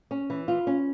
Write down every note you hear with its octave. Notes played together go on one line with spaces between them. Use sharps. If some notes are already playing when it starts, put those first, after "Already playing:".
C#4
E3
F4
C#4